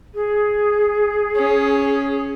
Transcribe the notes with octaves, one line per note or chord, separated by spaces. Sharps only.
G#4
C#4